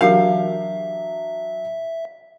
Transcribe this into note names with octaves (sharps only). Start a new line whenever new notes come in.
E3 F#3 D4 G4 A#4 E5 F5 C7